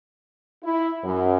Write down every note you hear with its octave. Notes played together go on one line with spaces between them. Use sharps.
E4
F#2